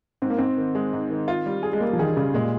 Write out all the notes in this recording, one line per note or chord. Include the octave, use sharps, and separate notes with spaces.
G#2 C4
A#3
G#2 C4
D#3
G#3
G#2
D#3
F4
G3
G#4
G#3
G3 A#3
F3
D#3 G#4
D#3
C#3 G3
A#2 G#3